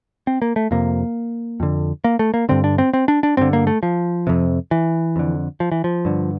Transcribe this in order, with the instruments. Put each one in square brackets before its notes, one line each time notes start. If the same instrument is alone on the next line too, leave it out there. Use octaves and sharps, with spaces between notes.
[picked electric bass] C4
A#3
A3
F2 C3 A#3
F2 D3
A#3
A3
A#3
G2 D3 C4
D4
C4
C4
D4
D4
G2 D3 C4
A#3
A3
F3
F2 C3
E3
F2 D3
F3
E3
F3
G2 D3